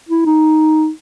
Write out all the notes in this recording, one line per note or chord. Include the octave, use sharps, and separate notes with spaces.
E4
D#4